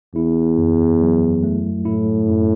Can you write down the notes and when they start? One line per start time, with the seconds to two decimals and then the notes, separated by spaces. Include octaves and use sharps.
0.15 E2 E4
0.58 F#2
1.01 F#3
1.43 A3
1.85 A2 E4
2.29 F#2